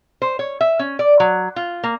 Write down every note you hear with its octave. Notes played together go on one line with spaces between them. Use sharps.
C5
C#5
E5
C#4
D5
F#3
F4
A#3